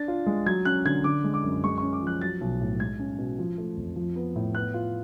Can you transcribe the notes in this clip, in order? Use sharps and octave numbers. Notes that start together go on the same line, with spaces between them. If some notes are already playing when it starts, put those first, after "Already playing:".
Already playing: D4 A6
F4
G#3
F#3 G#6
C#4 F#6
D3 G#6
D3 D6
G#3
D6
F#2
G#3 C#6
C#4 C#6
D6
F3 F#6
F#3 A6
B1
A2
G#3 G#6
C#4
B2
F3
A3
F2
F3
B3
A2
B3 F#6
F4